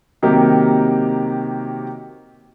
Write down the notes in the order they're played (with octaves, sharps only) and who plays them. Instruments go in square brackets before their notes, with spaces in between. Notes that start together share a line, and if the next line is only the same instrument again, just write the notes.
[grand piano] C3 D#3 F#3 A#3 G4